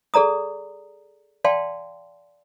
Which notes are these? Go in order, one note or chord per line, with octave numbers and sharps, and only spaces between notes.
G#4 A4 D5 A#5 D#6
D5 F5 G5 A5 C6